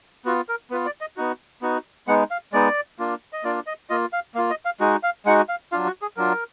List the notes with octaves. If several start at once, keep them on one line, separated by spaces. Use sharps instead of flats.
B3 F4 F#4
A#4
B3 F4 B4
D5
D#5
B3 D#4 F#4
B3 D#4 F#4
G#3 B3 D#4 F#5
F5
G#3 B3 D#4 D5
A#3 D4 F4
D#5
A#3 D4 F4 D5
D#5
A#3 F4 D#5
F5
A#3 F4 F5
D#5
F5
G#3 D#4 F#4
F5
G#3 D#4 F#4 F#5
F5
F#3 D4 F4 F5
F#4
G#4
F#3 D4 F4 A#4